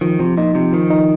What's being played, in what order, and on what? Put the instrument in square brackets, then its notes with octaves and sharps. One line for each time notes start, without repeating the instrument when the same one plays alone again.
[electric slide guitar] D#3 [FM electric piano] F3
[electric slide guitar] C3 [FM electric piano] F3
[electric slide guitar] A#2 [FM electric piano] D#4
[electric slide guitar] C3 [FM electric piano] F3
[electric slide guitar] D#3 [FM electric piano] F3
[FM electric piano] D#4